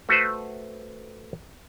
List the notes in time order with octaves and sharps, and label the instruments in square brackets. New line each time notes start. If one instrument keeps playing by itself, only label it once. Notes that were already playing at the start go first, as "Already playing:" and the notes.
[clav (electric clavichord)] A3 F#4 B4 C5